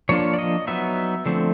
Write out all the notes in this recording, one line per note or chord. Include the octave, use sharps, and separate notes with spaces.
F3 A#3 D4 F4 C#5
D5
D#5
F#3 B3 D#4 E5
D3 F3 A3 C4